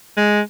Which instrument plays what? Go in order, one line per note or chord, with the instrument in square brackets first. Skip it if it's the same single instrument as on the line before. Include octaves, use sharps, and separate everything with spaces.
[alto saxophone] G#3